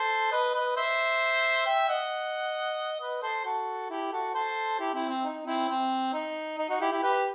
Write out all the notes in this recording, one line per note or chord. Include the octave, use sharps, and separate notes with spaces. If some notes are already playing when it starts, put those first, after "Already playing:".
Already playing: A4 C5
B4 D#5
B4 D#5
C5 E5
E5 G5
D#5 F#5
B4 D#5
A4 C5
F#4 A4
E4 G4
F#4 A4
A4 C5
E4 G4
C4 E4
C4
D#4
C4 E4
C4
D#4
D#4
D#4 F#4
E4 G4
E4 G4
G4 B4